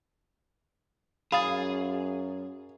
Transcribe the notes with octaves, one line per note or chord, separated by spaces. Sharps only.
F#2 G#4 F5 B5 D#6 A6